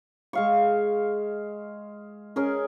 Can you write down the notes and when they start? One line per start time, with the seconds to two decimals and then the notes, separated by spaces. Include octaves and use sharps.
0.33 G#3 F5 C#6
2.36 C#4 G#4 A#4